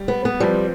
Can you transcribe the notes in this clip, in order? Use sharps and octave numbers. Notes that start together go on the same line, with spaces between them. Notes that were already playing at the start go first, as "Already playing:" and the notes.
Already playing: G3
B3
B3
F3 G3 C4 F4 B4